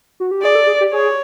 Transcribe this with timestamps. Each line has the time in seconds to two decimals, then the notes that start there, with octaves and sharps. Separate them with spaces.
0.20 F#4
0.31 G4
0.42 G#4 D5
0.55 A4
0.67 G#4
0.81 G4
0.92 G#4 C#5